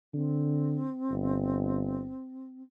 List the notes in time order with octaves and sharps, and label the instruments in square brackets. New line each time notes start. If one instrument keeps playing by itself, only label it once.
[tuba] D3 [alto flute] C4
[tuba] G1